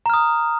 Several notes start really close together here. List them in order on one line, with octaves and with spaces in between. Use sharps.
A#5 F6 D#6